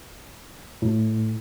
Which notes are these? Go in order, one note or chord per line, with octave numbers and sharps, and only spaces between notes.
A2